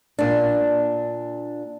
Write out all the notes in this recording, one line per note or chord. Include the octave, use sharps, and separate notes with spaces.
A#2 D4